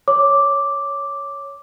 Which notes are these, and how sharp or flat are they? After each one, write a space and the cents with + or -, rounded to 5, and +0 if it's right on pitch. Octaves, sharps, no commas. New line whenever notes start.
C#5 +0 D6 +0